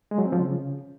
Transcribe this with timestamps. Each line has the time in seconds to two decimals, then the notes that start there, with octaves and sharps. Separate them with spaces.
0.11 G#3
0.18 F#3
0.25 C4
0.32 F3
0.39 C#3